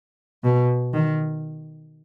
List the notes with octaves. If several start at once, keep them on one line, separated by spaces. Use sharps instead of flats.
B2
D#3